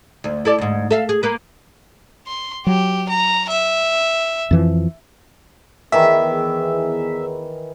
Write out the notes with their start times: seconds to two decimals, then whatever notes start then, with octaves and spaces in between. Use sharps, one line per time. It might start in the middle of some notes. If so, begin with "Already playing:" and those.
0.24 D2
0.45 E4 A4 D5
0.58 D2 G#2
0.91 A4 E5 F5
1.09 G#4
1.23 A#3 B4
2.27 C6
2.67 F#3 G4
3.09 A#5
3.50 E5
4.51 F2 E3 F3
5.92 E2 D#3 E3 B3 G#4 E5 D6